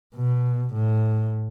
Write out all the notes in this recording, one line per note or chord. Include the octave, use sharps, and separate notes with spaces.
B2
A2